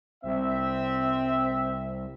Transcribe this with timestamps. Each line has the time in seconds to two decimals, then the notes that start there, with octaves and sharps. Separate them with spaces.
0.24 C2 C4 E5